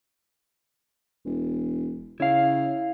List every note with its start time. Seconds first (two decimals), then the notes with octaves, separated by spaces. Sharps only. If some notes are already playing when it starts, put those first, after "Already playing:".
1.25 E1
2.20 C#3 E4 F5